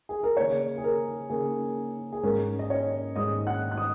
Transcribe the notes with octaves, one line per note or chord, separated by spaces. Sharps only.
G#4
A#4
C#3 A#3 C#4 C#5
G#4
A#4
C#3 A#3 C#4 G#4
G#4
G#2 G#3 C#4 A#4
D#5
C#4 C#5
G#2 G#3 C#4 D#5 D#6
F#5 F#6
F#6
D#5 D#6